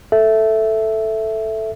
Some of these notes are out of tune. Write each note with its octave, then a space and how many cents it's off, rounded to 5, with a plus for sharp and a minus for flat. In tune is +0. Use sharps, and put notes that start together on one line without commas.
A4 +0 E5 +0